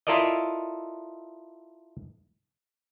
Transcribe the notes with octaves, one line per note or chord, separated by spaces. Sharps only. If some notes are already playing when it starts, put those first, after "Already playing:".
E4 F4 A4 A#4 D5 D#5